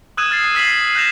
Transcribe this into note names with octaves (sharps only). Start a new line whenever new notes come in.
D#6 E6 F#6 G#6 D#7 E7
F6 A6 C7
E6 B6 C7 F#7
F#6 G6 A#6 E7 F7